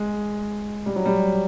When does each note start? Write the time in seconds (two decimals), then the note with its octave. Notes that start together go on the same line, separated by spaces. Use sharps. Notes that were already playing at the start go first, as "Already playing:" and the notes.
Already playing: G#3
0.86 G3
0.96 F#3
1.06 G3